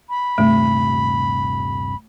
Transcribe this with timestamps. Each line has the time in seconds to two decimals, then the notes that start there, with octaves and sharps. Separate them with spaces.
0.09 B5
0.38 D#1 G2 C3 A3